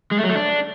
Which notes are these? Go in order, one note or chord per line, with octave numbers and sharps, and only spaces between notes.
G#3
A3
F#3
A3
D4